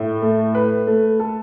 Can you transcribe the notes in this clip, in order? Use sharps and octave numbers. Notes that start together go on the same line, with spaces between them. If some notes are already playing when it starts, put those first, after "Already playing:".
Already playing: A2
A3
B4
A3
A4